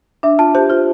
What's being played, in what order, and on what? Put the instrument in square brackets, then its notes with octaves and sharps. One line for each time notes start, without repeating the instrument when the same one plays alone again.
[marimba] D4 [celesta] E5
[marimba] F4 [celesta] A5
[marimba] G4 [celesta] C5
[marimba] F4 [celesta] C5